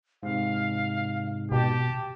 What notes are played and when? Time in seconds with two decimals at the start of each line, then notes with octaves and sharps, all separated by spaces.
0.23 G#2 C3 F5
1.52 B2 G4 A5